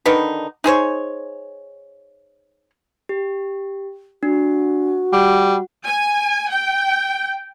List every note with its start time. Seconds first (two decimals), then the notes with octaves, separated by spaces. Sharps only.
0.06 D3 D#3 D#4 B4
0.64 D#4 G#4 C5 C#5
3.09 G4
4.23 D4 F#4
5.13 G3 F#5
5.85 G#5
6.50 G5